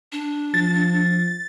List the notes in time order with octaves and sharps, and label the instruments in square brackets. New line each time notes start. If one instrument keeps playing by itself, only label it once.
[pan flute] D4
[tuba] F3 [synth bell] A6